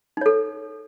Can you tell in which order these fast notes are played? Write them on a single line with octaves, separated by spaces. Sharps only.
D#4 C#5 A4